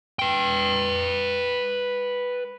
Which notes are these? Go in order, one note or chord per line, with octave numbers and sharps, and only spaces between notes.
B4 G5